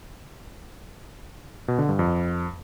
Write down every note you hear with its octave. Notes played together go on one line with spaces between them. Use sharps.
B2
D3
G2
F2